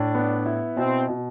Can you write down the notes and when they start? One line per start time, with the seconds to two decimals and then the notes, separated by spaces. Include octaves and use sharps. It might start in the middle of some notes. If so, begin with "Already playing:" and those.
Already playing: A2 D4
0.15 B3
0.46 E4
0.76 B2 C4
1.08 B2